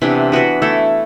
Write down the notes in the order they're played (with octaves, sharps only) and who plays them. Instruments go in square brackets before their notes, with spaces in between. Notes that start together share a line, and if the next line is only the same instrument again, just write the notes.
[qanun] C3 E3 B3 D4
E3 B3 F#4 B4
A3 E4 A4